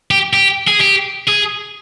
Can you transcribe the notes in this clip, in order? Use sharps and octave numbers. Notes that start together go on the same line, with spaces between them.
G4
G4
G#4
G4
G#4